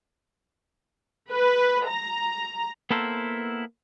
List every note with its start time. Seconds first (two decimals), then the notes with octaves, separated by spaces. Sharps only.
1.32 B4
1.88 A#5
2.91 A#3 B3 E4 A4 A#4 C5